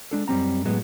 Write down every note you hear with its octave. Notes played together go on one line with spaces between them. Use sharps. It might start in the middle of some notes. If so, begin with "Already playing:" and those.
G#3 D4 A4
F#2 G3 C4 A#5
A2 F#3 G#3 B3